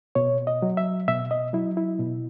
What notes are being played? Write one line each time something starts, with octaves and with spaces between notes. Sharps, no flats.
B2 C#5
D#5
F#3
E5
B2 E5
D#5
F#3 E4
E4
B2